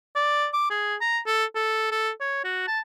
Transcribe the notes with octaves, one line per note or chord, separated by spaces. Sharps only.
D5
D6
G#4
A#5
A4
A4
A4
C#5
F#4
A5